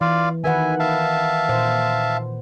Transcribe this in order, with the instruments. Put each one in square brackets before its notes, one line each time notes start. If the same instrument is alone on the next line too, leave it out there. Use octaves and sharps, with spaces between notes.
[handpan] E3 [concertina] F4 D5 F5
[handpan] D#3 B4 F#5 [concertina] E5 G#5
[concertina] E5 F5 A5
[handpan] A#2 C5